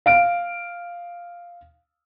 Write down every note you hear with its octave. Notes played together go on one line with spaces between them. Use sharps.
F5 D7